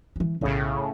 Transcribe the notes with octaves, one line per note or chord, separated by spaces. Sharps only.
E3 F#3
B1 A2 C#3 E4